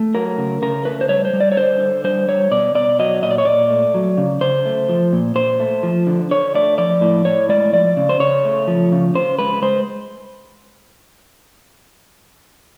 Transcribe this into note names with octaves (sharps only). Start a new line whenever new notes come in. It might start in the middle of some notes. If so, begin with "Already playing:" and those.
Already playing: A3
F#3 A#4
C#3
C#3 A#4
A3 B4
C5
G3 C#5
C5
G3
D5
C#5
D3 C5
D3
G3 C5
G3 C#5
B2 D5
B2 D5
F#3 D#5
A#2 D#5
D5
C#5
A#2 D5
A3
F#3
C#3
C#3 C5
A3
F3
A#2
A#2 C5
A3
F3
D3
D3 C#5
A3 D5
F3 D5
A2
A2 C#5
G#3 D5
F3 D5
C#3
C5
C#3 C#5
A3
F3
C#3
C#3 C5
G#3 B4
G#3 C5